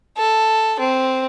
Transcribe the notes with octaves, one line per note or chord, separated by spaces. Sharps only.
A4
C4